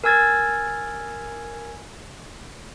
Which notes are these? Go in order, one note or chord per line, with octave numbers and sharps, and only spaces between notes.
A#4 G#5 E6 G#6 A6